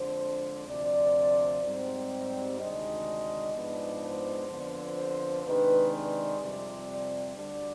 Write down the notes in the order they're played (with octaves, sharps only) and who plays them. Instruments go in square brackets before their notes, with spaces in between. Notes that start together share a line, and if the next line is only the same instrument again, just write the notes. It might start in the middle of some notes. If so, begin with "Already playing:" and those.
Already playing: [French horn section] F2 D3 G#3 D4 C5
D2 C3 F3 D5
G#2 G3 C4
D2 C3 D#3 G#3 D4 D#5
G#2 F3 G#3 B3 D4
C5
F2 D3 F3 B3
C5
C3 D#3 G#3 D4 B4
D5
F2 C3 G3
D5
D2 D3 G3 D4 D5